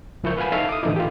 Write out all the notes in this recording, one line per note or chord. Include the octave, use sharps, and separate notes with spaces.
C#2 F3 E4 A#4 C#6 G6
B4 F5 F#5 G#5 B5
D#4 E4 A4 C#5 E5 F5
D6 D#6
A2 D3 E3 F3 D#4 E4
F4 G4